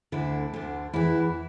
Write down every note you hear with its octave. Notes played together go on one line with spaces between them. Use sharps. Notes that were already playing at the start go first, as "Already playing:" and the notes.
D2 D3 E4
D2 D3
E2 E3 E4